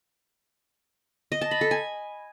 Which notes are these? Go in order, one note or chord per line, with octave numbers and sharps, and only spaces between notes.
D#5
A5
B5
A4
G#5